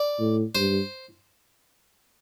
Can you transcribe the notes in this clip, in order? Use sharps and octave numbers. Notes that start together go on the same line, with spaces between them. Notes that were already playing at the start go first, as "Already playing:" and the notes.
Already playing: D5
A2
G2 C5